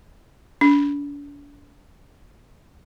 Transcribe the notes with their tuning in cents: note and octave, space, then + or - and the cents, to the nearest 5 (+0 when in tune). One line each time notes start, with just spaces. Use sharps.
D4 -40